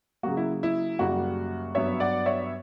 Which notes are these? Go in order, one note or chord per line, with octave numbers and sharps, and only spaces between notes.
C#3 F#3 A#3 F#4
E4
E4
F#2 C#3 G3 A#3 F#4
G2 F#3 B3 C#5 E5
D5 F#5
C#5 E5